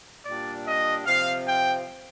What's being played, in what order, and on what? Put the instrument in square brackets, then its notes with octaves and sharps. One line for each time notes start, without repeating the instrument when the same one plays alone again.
[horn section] A#2 G3 D4 D5
D#5
C3 F3 C4 F5
G5